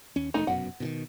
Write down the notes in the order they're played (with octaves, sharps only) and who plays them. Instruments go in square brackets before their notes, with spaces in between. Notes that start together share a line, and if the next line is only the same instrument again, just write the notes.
[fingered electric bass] D#2 C#4
[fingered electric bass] E1 A3 [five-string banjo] D#4
[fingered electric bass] F1 F#2 B2 [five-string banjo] F#5
[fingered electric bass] B2 D3 D#3